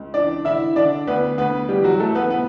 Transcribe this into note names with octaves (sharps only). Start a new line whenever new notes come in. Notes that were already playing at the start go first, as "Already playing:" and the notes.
Already playing: C#2
E3 D4 D5
D3 E4 E5
D3 D4 D5
D2 B3 B4
D2 B3 B4
E3 G3 G4
F#3 F#4
E3 A3 A4
B3 B4
B3 B4